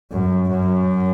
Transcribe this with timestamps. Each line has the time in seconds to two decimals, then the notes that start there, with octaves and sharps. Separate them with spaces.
0.12 F#2
0.49 F#2